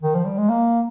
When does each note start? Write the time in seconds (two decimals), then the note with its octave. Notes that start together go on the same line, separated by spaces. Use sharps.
0.03 D#3
0.15 F3
0.26 G3
0.38 G#3
0.50 A#3